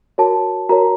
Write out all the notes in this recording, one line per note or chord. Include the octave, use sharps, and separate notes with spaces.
F#4 A#4 C#5 A5
F#4 A#4 C#5 A#5